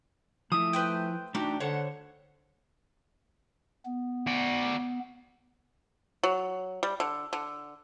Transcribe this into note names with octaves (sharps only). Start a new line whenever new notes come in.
F3 A3 E4 D#6
B4 C5 G5
A3 D4 D#4 F#4 G4
D3 A4 C5 C#5 F#5
B3
F#4 D5
F#3
G3
D3
D3